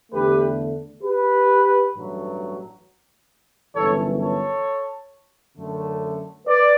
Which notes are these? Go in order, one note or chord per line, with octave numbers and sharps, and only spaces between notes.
E2 D3 A3 G4 B4
G4 B4
A1 G2 F#3 A3
G1 F#2 E3 A4 C#5
A4 C#5
F#2 D3 A3
B4 D5